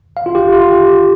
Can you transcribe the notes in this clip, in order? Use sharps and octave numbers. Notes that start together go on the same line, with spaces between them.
F5
F4
G4
F4
G4